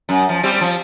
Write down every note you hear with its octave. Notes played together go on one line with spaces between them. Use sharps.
F#2
F3
G3 C4 G4
F3